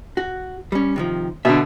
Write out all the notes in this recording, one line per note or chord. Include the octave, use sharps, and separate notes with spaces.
F#4
G3 C#4
C3 D#3 F3
B2 D3 E5